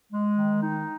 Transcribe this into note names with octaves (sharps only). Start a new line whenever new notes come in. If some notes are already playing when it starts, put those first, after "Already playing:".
G#3
D#3
D#4